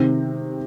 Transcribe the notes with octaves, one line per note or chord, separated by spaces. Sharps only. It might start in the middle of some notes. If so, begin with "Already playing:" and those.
Already playing: C3 D#3 C4